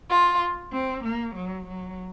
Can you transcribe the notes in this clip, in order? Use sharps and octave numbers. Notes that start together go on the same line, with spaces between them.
F4
C4
A#3
F#3
F#3